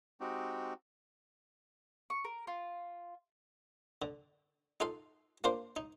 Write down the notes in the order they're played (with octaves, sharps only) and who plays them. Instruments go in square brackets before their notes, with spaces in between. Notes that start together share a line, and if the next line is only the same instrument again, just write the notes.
[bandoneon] G#3 C4 D#4 F#4 G4
[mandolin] C#6
A#4
F4
[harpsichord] D3
D#4 F4 A4 F5
A#3 D4 F4 C5 F5
D#4